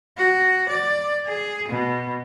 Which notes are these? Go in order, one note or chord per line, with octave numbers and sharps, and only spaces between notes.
F#4
D5
G#4
B2